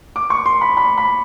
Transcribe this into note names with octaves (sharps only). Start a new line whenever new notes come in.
D6
C#6
C6
B5
B5
B5